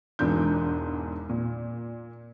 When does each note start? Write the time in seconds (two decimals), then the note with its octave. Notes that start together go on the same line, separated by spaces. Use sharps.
0.19 E1 E2 G#2 D4 G6
1.29 A#2